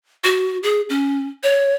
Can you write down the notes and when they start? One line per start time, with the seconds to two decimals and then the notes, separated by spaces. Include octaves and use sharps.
0.24 F#4
0.63 G#4
0.90 C#4
1.43 C#5